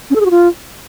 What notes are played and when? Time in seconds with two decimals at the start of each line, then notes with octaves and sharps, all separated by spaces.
0.10 C#4
0.15 A4
0.20 G#4
0.26 F#4
0.31 F4